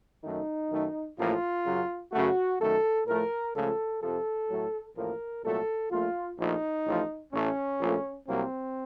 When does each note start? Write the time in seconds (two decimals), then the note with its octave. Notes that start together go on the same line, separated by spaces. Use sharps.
0.24 F#2 D#3 A3 D#4
0.71 F#2 D#3 A3
1.18 A1 A2 F3 A#3 F4
1.66 F#2 C#3 F#3
2.12 F#2 C#3 A3 F#4
2.60 F#2 D#3 A3 A4
3.07 A2 F3 A3 A#4
3.54 C#2 C#3 F3 A3 A4
4.02 F2 C3 F3 A4
4.49 A2 F#3 A3
4.96 A1 A2 F3 A#3 A#4
5.44 C2 A#2 F#3 A3 A4
5.91 A#1 A#2 A3 F4
6.38 A#1 A#2 F3 A3 D#4
6.86 A1 A2 F3
7.33 A1 A2 A3 C#4
7.80 A#1 A#2 F3 A3
8.27 C2 C3 F#3 A#3 C4